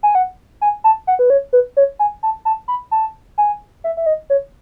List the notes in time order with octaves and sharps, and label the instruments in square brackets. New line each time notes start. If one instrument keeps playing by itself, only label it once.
[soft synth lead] G#5
F#5
G#5
A5
F#5
B4
C#5
B4
C#5
G#5
A5
A5
B5
A5
G#5
E5
E5
D#5
C#5